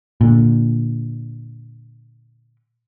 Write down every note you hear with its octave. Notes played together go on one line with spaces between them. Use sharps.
A#2 D3